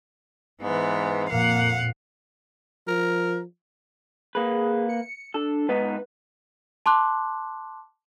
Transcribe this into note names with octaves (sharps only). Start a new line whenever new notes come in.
G#2 E3 B3
F2 A#2 A#3 F5 F#5
F3 A#4
A#3 G#4 B4
C#7
D4 A4
G#2 B3 D#4 B4
A5 C6 D6 F#6